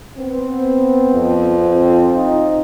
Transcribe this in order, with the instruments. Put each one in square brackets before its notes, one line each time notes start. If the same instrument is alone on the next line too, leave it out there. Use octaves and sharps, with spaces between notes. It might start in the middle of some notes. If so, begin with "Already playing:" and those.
[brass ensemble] B3 C4
[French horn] F2
[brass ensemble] C4 F4
[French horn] D#4